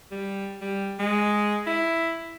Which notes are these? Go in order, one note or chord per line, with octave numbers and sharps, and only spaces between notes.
G3
G3
G#3
E4